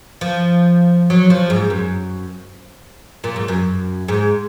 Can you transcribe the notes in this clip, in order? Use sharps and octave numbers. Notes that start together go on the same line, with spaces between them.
F3
F#3
F3
G#2
F#2
A#2
G#2
F#2
G#2